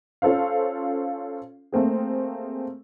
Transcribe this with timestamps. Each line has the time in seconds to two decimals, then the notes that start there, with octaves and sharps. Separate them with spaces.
0.22 C#4 F4 A4 C5 F5
1.72 A3 A#3 C4 G#4